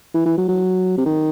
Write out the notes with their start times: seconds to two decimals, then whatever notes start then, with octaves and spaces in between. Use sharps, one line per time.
0.14 E3
0.26 E3
0.38 F#3
0.49 F#3
0.98 C3
1.06 D#3